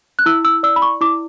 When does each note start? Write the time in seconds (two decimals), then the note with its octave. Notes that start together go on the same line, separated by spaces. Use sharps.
0.19 F#6
0.26 E4 E6
0.45 E6
0.63 D5 E6
0.76 B5
0.82 C#6
1.01 E4 D6